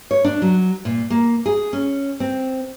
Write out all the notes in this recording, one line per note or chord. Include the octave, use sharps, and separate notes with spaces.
C#5
D4
F#3
A#2
A#3
G#4
C#4
C4